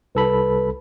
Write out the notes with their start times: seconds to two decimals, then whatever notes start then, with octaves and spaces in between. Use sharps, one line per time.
0.15 C2 A4 B4 B5